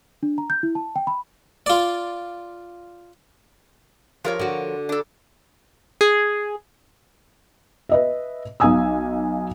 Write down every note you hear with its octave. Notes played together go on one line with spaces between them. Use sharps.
D4
A#5
G6
E4
A5
G5
B5
F4 D5
F3 F4 G4 A#4 C#5
D3 F#4
D4 A4
G#4
B4 D#5 E5
B1 D#4 F5 G#5 D#6 E6